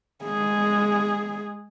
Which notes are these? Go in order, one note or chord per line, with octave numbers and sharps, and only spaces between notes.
G#3 G#4